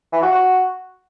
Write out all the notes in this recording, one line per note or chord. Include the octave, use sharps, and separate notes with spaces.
E3
F#4
F#4